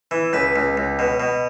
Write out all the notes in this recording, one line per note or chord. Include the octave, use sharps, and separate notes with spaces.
E3
C#2 B4
C#2
C#2
B2
B2